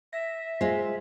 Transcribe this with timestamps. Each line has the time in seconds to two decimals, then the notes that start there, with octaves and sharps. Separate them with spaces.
0.13 E5 A#6
0.61 G#3 F4 C5